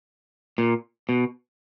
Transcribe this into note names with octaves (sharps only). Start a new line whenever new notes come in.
A#2
B2